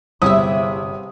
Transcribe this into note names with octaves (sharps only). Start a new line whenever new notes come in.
G1 C3 E4 G#4 E5 D#6